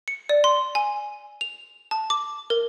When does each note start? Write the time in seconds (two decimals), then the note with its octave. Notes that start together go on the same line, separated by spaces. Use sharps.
0.08 C#7
0.29 D5
0.44 C6
0.75 G#5
1.41 F7
1.91 A5
2.10 D6
2.50 A#4